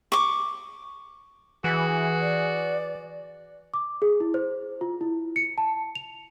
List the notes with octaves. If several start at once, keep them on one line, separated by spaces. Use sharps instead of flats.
C#6 D6
E3 F#4 G#4
D5
D6
G#4
E4
C5
F4
E4
C#7
A5
F7